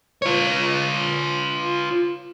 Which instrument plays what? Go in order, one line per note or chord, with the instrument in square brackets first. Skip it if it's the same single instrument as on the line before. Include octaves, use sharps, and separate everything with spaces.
[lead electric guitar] F4 C#5